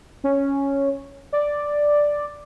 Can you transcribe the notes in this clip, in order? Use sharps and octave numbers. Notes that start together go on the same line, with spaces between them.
C#4
D5